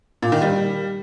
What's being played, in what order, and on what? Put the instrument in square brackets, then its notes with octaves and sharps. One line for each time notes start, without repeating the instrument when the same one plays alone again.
[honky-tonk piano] A#2
D#3
G3